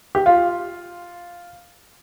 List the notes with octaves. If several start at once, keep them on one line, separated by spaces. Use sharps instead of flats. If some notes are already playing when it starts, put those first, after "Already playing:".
G4
F4